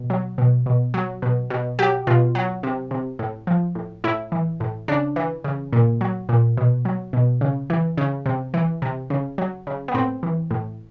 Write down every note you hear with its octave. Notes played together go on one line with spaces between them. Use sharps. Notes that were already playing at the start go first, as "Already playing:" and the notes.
Already playing: B2
F#3
B2
B2
F#3
B2
B2
F#3 G4
B2 F4
F#3
C3
C3
A2
F3
A2
A2 E4
E3
A2
C#3 D4
E3
C#3
A#2
F#3
A#2
B2
F#3
B2
C#3
E3
C#3
C3
E3
C3
C#3
F#3
C#3
B3
A2 C4
E3
A2